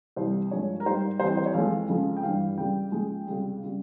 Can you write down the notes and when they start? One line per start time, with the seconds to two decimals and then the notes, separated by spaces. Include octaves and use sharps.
0.16 C2 C3 E3 G3 C5
0.51 G2 F3 G#3 C#5
0.80 A#4
0.86 G#2 G3 C5
1.20 C2 C3 E3 C5
1.37 C5
1.46 C#5
1.54 F2 E3 G#3 F5
1.89 F2 C#3 F3 G#3
2.17 G5
2.23 G2 E3 G3 F5
2.58 C#2 C#3 G3 G5
2.92 C#2 C#3 F3 G#3
3.27 C#2 C3 G3
3.64 C#3 G3